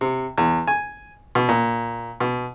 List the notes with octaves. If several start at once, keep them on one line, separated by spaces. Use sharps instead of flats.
C3
E2
G#5
B2
A#2
B2